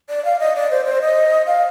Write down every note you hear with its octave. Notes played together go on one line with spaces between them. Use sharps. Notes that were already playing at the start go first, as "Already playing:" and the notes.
D5
F5
D#5
D5
C5
C5
D#5
F5